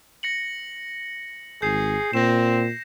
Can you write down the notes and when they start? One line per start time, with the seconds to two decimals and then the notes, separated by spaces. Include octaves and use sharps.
0.23 A#6 C#7 F#7
1.62 G#1 G#4 G6 C7
2.13 A#2 C4 A#6 E7